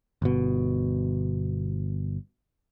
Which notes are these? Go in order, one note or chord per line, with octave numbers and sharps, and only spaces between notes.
G1 B2